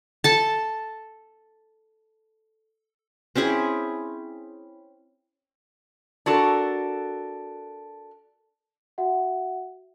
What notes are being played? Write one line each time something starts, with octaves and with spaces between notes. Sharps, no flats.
A4 A5
C4 C#4 E4 G#4
D4 F#4 A4 A#4
F#4 E5 F#5